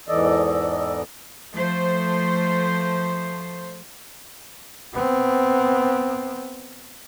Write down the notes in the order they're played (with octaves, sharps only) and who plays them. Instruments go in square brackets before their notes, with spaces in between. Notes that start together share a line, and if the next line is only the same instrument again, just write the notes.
[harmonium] E2 G#2 E3 A4 D5 D#5
[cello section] F3 A3 C5
[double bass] B3 C4